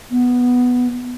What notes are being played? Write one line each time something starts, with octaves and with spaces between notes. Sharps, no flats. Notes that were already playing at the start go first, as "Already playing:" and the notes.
B3